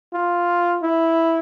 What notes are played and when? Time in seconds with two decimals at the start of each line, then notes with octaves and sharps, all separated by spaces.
0.14 F4
0.83 E4